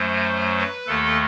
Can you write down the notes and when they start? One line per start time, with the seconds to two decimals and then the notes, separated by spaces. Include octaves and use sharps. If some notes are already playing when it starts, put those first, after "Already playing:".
Already playing: F#2 F#3 A3 C5
0.58 B4
0.87 D#2 D#3 A3 A4